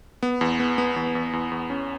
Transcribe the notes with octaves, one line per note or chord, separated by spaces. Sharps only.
B3
E2
B3
B3
E2
E2
E2
E2
C#4